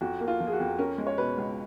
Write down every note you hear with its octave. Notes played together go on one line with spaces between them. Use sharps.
F2 F#4
A#3
F4
F3
G#4
F#4
F2
C#4 A#4
G#3
C#5
B2 B4
C#2